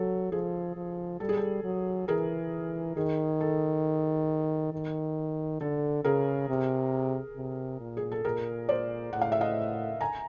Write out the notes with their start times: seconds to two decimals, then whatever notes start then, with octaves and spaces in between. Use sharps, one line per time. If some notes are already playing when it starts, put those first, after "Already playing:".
Already playing: F#3 A4
0.32 F3 G#4
0.76 F3
1.20 G3 A4
1.29 G#4
1.37 A4
1.64 F#3
2.08 E3 G#4 A#4
2.96 D#3 G#4
3.41 A4
4.73 D#3
5.60 D3 A4
6.04 C#3 G#4 A#4
6.49 C3
7.37 C3
7.80 A#2
7.97 G#4
8.12 A4
8.25 A#2 G#4 A#4
8.69 C5 D5
9.13 A2 F#5
9.22 F5
9.32 E5
9.41 D#5 F5
10.01 G#5 A#5